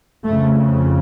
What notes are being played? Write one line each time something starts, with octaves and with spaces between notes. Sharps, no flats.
F2 C#3 A3